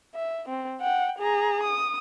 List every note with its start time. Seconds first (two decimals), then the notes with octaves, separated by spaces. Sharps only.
0.15 E5
0.49 C4
0.80 F#5 G5
1.19 G#4 A#5
1.63 D#6